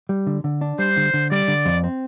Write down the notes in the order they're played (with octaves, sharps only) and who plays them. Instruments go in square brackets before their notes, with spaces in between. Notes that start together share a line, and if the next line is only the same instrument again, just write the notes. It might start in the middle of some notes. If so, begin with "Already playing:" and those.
[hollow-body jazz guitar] G3
D3
D3
D4
[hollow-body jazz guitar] G3 [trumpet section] C5
[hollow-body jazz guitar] D3
D3
[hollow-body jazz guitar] G3 [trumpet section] D5
[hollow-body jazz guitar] D3
F2
C4